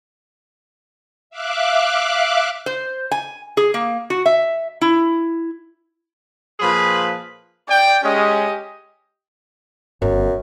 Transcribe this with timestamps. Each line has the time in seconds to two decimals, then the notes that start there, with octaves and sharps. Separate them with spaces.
1.30 E5 F5 D6 F#6
2.66 C5
3.11 G#5
3.57 G#4
3.74 A#3
4.10 F#4
4.26 E5
4.81 E4
6.60 A#2 F3 G#4 B4 B5
7.69 D5 G5
8.03 G#3 C#4 G4 D#5
10.02 G1 F#2